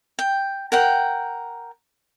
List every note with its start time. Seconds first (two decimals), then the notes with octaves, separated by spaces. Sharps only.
0.19 G5
0.72 A#4 F#5 G5